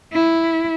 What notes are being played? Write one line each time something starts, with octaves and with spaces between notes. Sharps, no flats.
E4